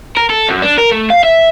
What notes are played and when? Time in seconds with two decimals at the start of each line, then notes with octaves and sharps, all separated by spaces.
0.17 A#4
0.30 A4
0.49 F#2
0.62 D4
0.78 A#4
0.92 A3
1.10 F5
1.23 E5